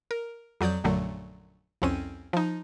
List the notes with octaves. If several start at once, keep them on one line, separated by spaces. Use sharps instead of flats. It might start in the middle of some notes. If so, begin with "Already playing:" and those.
A#4
F2 F#3 D5 D#6 G6
A#1 F#2 A#2 D3 F#3 A3
C2 F2 C4 C#4 D#7
F3 D#4